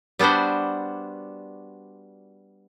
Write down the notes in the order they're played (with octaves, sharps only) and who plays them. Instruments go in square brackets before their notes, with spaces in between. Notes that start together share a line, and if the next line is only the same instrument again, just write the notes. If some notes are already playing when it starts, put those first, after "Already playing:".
[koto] G3 B3 D4 F#4 C5